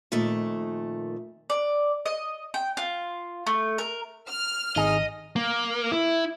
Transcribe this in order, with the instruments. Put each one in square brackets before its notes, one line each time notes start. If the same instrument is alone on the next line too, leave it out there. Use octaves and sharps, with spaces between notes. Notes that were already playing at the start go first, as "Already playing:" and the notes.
[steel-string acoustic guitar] F2 A#2 D#3 A3 A4
[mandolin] D5
D#5
G5
F4
A3
A#4
[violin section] F6
[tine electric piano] G#1 [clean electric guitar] D#4 G#4 [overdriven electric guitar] D#5
[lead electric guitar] A#3
E4